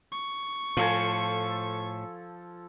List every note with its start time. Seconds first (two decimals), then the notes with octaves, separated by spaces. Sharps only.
0.12 C#6
0.77 A2 F3 A4 G#5